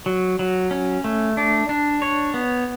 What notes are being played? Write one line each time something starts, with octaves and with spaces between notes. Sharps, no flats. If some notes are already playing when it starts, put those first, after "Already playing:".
F#3
F#3
C#4
A3
D4
D4
C#5
B3